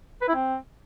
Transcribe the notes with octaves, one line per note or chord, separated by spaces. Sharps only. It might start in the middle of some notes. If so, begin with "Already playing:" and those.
B4
E4
C4